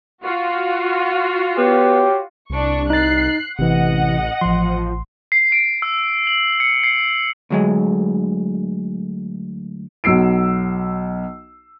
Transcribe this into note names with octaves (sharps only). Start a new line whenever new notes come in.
F4 F#4
B3 G4 C#5
C2 D4 C#6
D#4 F#6 A6 C7
A1 C3 E3 D#5 F#5
A1 F3 C6
C7
D7
E6
F#7
C#7
C7
D2 F#3 G#3
B1 F#3 E6 C7 D7